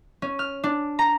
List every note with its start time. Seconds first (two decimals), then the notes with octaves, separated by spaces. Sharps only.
0.22 C#4
0.39 F6
0.64 D4
0.99 A#5